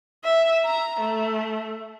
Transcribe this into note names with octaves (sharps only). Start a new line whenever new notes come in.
E5
A#5
A3